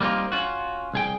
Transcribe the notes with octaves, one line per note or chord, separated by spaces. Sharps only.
G3 A#3 C4 D#4 F4
C#4 F4 F#4
C2 G#4 G5